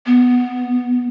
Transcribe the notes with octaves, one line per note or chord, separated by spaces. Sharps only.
B3